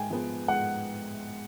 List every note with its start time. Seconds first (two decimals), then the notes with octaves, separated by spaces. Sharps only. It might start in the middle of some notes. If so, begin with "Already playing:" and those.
Already playing: G#2 G5 G#5
0.10 F3 G#3 B3
0.48 G#2 F#5